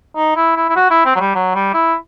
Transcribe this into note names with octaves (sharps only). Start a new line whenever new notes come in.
D#4
E4
E4
E4
F#4
E4
C4
F#3
G3
F#3
G3
E4